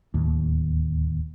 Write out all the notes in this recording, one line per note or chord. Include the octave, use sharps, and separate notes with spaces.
D1 D#2